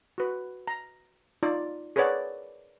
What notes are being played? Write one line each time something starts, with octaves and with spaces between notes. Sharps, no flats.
F#4 B4
A#5
D#4 F4 D5
G#4 A#4 B4 C#5 D5 F#5